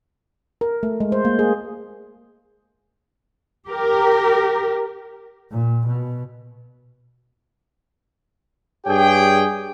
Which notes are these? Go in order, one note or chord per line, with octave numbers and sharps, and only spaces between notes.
A#4
A3
G#3
C5
A#3
G#4
G4 A#4
A#2
B2
G2 G4 G#4 C#5 G5